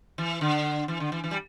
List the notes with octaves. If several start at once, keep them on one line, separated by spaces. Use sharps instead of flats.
E3
D3
E3
D3
E3
E3
G3